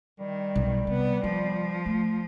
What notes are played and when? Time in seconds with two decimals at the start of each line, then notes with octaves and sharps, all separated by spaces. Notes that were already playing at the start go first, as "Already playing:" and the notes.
0.20 D#3 G3
0.56 B1
0.87 C3 B3
1.24 F3 B3
1.86 A3